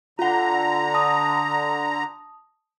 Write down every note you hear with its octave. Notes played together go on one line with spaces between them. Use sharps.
D3 F4 F#5 A#5
A5 D#6